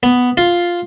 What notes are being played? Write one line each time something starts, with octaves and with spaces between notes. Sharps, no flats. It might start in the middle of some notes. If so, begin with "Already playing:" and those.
B3
F4